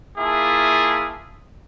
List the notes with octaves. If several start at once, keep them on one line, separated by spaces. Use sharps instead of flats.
A#3 E4 F4 G#4 E5 A5